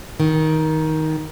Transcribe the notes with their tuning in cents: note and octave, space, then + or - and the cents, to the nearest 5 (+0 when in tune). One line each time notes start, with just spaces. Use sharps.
D#3 +15